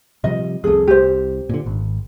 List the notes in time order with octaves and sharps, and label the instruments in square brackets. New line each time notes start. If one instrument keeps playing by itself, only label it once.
[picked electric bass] C3 F3 G3 [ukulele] D#5
[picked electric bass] C2 F2 [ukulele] G#4 A4
[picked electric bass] C2 [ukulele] G4 C5
[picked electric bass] A#2 D3
G#1